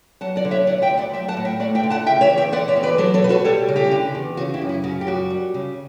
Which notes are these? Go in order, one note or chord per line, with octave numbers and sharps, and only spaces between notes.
F#3 F#5 A5
D5 F#5
D3
C#5 E5
D3 D5 F#5
E5 G5
D2
D5 F#5
F#3 E5 G5
F#5 A5
A2
E5 G5
A3 D5 F#5
E5 G5
D3
F#5 A5
C#3 E5 G5
C#5 E5
E2
E5 G5
D3 D5 F#5
C#5 E5
E2
B4 D5
F#3 A4 C#5
A4 C#5
B2 B4
F#4 A4
G3 A4 C#5
C#3
E4 G4
D3
E2
C#3 F#4
E4 G4
F#2
E4
C#3 F#4
G4
F#2 F#4
G3
C#3